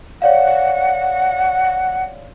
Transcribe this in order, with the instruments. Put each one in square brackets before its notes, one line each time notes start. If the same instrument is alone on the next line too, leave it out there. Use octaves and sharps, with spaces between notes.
[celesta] C#5 D5 F5 [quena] F#5